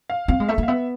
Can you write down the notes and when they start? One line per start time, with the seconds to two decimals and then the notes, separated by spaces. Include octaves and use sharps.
0.10 F5
0.28 C4 F5
0.40 G#3
0.48 A3 E5
0.58 A#3
0.63 F5
0.68 B3 E5